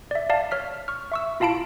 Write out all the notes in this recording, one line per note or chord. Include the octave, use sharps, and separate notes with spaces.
D5 E5
D5 F5 A5
C#5 F6 B6
C#6 F6
E5 C#6 E6
E4 F4 F5 A5 B5 D7